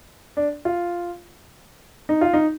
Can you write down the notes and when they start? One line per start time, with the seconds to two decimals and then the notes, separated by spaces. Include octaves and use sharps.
0.37 D4
0.65 F4
2.09 D#4
2.21 F4
2.33 D#4